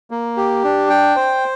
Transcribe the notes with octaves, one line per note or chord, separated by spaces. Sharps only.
A#3
G4
D4
G5
C5